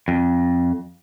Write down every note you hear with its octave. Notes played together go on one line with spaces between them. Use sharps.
F2